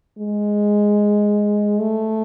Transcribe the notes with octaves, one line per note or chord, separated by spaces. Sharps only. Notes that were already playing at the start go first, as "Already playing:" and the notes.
G#3
A3